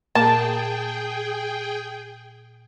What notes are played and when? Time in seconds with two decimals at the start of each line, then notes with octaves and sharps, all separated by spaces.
0.15 A#2 A#3 G#4 A#4 G5 A5